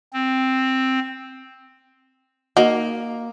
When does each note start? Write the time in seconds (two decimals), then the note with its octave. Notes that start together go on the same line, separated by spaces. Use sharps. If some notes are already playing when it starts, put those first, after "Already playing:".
0.13 C4
2.57 A#3 D#4 F#4 A#4